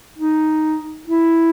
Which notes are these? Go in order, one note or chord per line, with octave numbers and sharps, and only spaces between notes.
D#4
E4